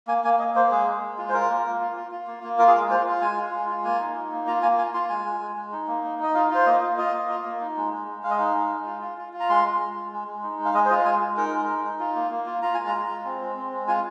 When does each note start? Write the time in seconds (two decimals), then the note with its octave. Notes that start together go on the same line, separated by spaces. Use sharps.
0.08 A#3 G#5
0.24 A#3 G#5
0.39 A#3 D#5
0.55 A#3 C5
0.71 G#3 G#4
0.87 G#3
1.02 G#3
1.18 F4
1.29 C5
1.34 F4 A#4
1.50 A#3
1.66 A#3
1.81 F4
1.96 F4
2.11 F4
2.28 A#3
2.43 A#3
2.59 F4 A#4
2.68 G#4
2.74 G#3 A#4
2.90 F4 C5
3.06 F4 F5
3.22 G#3 G#5
3.37 F4
3.54 G#3
3.69 F4
3.84 A#3 G#5
4.00 D#4
4.15 D#4
4.32 A#3
4.47 F4 A#5
4.63 A#3 G#5
4.78 F4 G#5
4.94 F4 C6
5.09 G#3 G#5
5.26 G#3
5.41 G#3
5.56 G#3
5.73 D#4
5.88 A#3
6.04 D#4
6.19 D#4 D#5
6.35 F4 F5
6.51 F4 C5
6.66 A#3 D#5
6.82 F4
6.98 F4 D#5
7.13 A#3
7.29 F4
7.45 A#3
7.61 D#4
7.77 G#3
7.93 G#3
8.08 G#3
8.23 G#3 F5
8.30 D#5
8.38 D#4 F5
8.55 G#3
8.71 G#3
8.86 F4
9.02 F4
9.18 F4
9.33 F4
9.40 A#5
9.49 G#3 C6
9.65 G#3
9.80 G#3
9.97 G#3
10.12 G#3
10.28 G#3
10.43 D#4
10.59 G#3
10.65 F5
10.74 G#3 D#5
10.86 C5
10.90 F4 D#5
11.05 G#3 G#5
11.21 G#3
11.37 D#4 A#4
11.53 G#3
11.69 D#4
11.84 D#4
12.00 F4
12.15 A#3
12.31 A#3
12.46 F4
12.62 F4 A#5
12.74 G#3 G#5
12.87 A#5
12.95 F4
13.09 G#3
13.25 C4
13.41 G#3
13.57 C4
13.72 G#3
13.88 F4 G#5